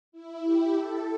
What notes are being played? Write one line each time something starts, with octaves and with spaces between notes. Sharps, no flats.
E4
G4
A4